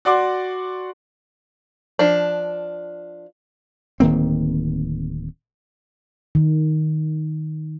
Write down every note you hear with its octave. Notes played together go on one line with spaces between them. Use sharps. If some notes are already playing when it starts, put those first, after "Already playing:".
F#4 D5 F#5 C6 D6
F3 D4
D1 D#3 A#3 C4
D#3